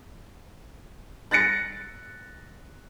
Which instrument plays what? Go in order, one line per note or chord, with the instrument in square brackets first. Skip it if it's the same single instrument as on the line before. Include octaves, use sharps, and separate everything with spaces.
[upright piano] F#6 A6 A#6 C#7